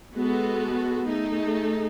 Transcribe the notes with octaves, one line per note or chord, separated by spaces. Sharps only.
G#3 B3 F#4 A4
A3 D#4 G#4